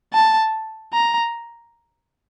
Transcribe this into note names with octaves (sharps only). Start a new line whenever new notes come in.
A5
A#5